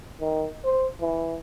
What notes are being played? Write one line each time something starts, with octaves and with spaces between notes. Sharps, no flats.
D#3
C5
E3